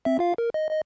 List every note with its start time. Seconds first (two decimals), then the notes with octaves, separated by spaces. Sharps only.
0.05 C4 E5
0.19 F4 F5
0.38 A#4
0.54 D#5
0.71 D#5